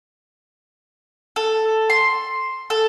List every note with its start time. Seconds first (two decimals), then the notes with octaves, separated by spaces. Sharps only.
1.36 A4
1.90 C6
2.70 A4